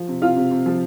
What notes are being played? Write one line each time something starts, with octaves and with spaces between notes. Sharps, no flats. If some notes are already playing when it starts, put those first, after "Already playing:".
Already playing: F3
C3
C3 F4 F5
C3
C3
F3